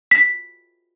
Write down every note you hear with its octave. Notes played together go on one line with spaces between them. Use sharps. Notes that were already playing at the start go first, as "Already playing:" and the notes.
B6